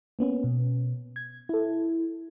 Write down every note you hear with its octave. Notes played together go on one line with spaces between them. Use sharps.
A#3 B3 C#4
B2
G#6
E4 A4